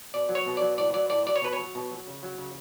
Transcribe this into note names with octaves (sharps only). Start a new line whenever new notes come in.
B2 D5
F#3
C#5
B2
F#3 D5
A2 D5
F#3 D5
A2 D5
F#3 D5
C#5
B2 B4
C#5
F#3
B2
F#3
C#3
F#3
C#3